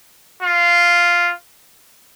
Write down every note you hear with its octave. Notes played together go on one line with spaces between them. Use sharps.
F4